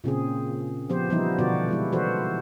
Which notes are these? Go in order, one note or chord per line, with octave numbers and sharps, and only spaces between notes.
A#2 C#3 C4 G#4
F3 B3 G4 C5
E3 F3 G3 B3 D#4 E4
B2 D3 B3 F#4 D5
G3 G#3 E4
E3 F#4 A4 B4 C5